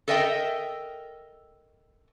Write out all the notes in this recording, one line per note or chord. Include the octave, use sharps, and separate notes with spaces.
A4 A#4 D#5 E5 G5